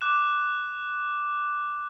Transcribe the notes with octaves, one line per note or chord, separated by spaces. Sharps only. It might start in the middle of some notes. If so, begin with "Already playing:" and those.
D6 F#6 E7